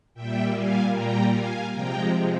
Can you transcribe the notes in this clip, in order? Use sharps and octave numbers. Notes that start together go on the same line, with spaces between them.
A#2 G3 E5 G5
F5 G#5
G5 A#5
F5 G#5
C3 F3 G#3 G5 A#5